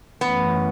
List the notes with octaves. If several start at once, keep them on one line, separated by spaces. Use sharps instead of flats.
F#2 E3 A3 B3 C#4